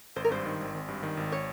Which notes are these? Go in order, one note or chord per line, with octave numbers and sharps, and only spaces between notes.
G#1 C5
A#4
G2 C5
D#3
G#1
G#1
G2
D#3
G#1
C#5